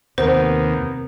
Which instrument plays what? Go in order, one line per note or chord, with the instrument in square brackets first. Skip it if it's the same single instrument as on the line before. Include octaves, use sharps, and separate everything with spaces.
[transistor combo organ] D#2 [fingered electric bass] C3 [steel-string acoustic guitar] B3 A#4 [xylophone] C5